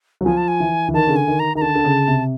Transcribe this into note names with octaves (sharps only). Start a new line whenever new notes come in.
F#3
F3 G#5
A5
G#5
E3
E3
D#3 A5
C#3
D3
G#5
D#3
A#5
D#3 A#5
D3 A5
D3
C#3
C3